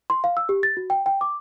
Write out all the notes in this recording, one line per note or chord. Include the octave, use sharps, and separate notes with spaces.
C6
F5
E6
G4
A6
F#4
G5
G5
D6